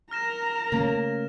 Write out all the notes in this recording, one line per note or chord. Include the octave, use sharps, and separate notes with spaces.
A#4 A#5 F6 A#6 E7
C#3 A3 A#3 C#4